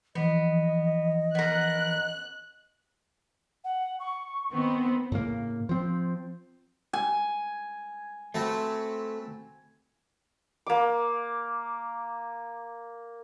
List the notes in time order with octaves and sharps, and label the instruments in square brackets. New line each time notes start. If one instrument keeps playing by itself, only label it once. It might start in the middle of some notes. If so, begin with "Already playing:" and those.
[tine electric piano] E3 F3 [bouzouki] B3 [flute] D#5
[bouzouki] B3 A#4 [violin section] F#6
[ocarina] F#5
C#6
[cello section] D#3 B3 C4
[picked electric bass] A2 C#3 A#3
F3 C4
[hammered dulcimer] G#5
[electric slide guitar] A3 [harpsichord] C4 F#4 B4
[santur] A#3 D6